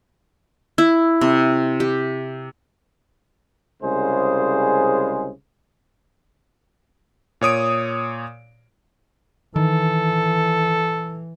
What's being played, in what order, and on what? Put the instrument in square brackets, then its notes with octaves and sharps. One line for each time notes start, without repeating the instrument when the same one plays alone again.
[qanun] E4
C3
G4
[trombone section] C2 C#3 G#3 G#4 C5
[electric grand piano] A#2 C#5 D#6 D7
[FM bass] D#3 [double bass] E3 [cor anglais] A4